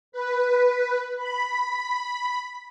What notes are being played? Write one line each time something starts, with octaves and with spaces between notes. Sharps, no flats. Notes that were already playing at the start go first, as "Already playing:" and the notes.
B4
B5